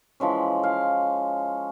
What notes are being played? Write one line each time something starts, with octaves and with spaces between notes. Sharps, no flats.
E3 F3 G#3 C#4
F5